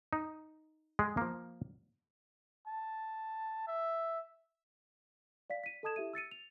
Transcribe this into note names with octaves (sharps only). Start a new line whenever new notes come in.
D#4
G#3 G#4
F3 A#3
A5
E5
D5 F5 B6
B6 D#7
A4 D#5 A5 D#6 G#6 E7
E4 G4 E5 D#7
E6 A6 C#7 D#7
F7